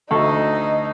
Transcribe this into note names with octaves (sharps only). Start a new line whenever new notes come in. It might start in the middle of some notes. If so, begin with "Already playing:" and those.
D2 D#4 A4 D#5 C#6